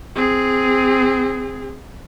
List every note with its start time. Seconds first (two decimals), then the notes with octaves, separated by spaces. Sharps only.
0.16 C4 G#4